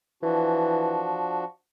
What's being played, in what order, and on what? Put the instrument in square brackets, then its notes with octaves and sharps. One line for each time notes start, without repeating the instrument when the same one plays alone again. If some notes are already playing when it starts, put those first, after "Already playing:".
[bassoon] E3 [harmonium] F3 D4 F#4